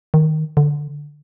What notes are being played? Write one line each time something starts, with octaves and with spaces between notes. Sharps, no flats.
D#3
D3